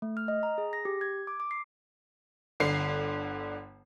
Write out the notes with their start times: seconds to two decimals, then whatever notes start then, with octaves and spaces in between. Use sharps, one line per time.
0.02 A3
0.17 F6
0.28 D#5
0.43 A#5
0.58 G#4
0.73 A#6
0.85 G4
1.01 G#6
1.27 D6
1.40 D6
1.51 C7
2.60 G1 D3 C7